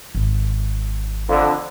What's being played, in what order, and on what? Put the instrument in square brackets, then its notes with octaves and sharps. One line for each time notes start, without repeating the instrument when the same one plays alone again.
[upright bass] G#1
[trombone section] F2 D3